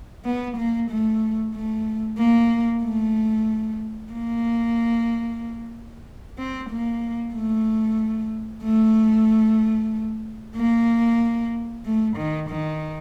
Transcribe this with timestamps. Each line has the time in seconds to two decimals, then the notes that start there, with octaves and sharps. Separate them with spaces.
0.25 B3
0.57 A#3
0.90 A3
1.55 A3
2.18 A#3
2.83 A3
4.12 A#3
6.38 C4
6.70 A#3
7.34 A3
8.63 A3
10.56 A#3
11.85 A3
12.17 D#3
12.49 D#3